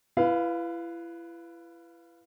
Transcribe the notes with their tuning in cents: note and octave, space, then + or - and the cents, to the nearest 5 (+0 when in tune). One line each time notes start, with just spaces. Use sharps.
E4 +35 B4 +0 F5 +0